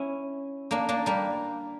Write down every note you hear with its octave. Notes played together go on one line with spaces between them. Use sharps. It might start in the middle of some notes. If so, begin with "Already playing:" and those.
Already playing: C#4 E4
A#3 D4
A#3 D4
G3 A#3